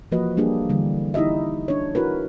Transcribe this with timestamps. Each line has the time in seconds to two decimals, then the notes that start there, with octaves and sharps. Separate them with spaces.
0.11 E3 F3 A#3 F#4 B4 D#5
0.37 G3 A#3 D4 G4 G#4
0.69 D3 E3 G3
1.14 D#4 E4 G4 D#5 E5
1.68 D4 C#5
1.95 E4 F#4 A#4 B4